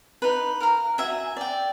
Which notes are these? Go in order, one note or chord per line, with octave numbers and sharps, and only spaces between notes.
D#4 B4
A#4 F5 A#5
F#4 E5 G#5
D5 G5